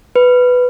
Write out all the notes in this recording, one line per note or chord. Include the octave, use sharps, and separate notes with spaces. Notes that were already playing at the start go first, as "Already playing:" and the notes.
B4